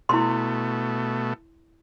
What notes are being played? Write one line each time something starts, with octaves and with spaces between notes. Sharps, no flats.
B2 A3 E4 C6